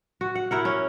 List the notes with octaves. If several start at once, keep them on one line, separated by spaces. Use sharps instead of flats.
F#4
F#5
E4 A#4 F#5
C#4